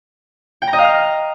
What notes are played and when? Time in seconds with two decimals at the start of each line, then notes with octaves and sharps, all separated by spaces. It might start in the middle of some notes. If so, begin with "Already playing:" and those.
0.62 G5
0.67 A#5
0.73 D#5
0.78 F5
0.84 F6